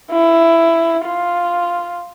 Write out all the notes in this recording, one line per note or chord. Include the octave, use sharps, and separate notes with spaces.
E4
F4